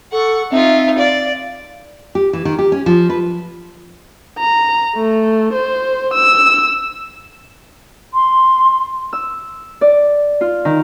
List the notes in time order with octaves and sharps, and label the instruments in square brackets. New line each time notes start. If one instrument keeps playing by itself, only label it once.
[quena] A4 [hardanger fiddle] F#5 C#6
[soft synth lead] C4 [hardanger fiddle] D#4 F4 [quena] E5
[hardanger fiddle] D5 [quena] F5
[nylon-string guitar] G4
E3
D#3
G4
C#4
F3
B4
[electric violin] A#5
A3
C5
E6
[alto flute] C6
[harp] E6
D5
F4
D#3